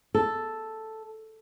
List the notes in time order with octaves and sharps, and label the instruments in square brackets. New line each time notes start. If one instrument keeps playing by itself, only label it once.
[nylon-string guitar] A4